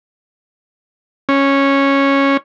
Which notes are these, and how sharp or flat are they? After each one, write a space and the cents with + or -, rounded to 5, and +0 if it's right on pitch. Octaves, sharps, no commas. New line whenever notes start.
C#4 -5